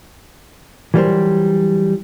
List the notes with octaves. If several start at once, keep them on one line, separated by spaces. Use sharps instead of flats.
E3 F#3 G3 F#4 A#4 C5